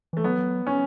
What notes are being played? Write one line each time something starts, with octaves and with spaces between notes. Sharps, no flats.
E3 A3
F#3 B3
C#4